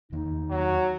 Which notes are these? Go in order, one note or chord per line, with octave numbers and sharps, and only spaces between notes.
E2 D#3 A#3 D#4
F#3